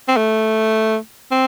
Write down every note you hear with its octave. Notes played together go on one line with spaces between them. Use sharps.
C4
A3
C4